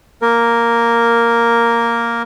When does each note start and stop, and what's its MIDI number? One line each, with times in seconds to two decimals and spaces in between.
0.22 2.22 58
0.22 2.22 70